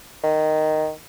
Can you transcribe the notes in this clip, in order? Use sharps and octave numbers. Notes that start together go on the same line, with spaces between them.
D#3